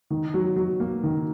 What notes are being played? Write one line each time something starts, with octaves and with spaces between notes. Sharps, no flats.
D#3
F#3
F#3
A#3
D#3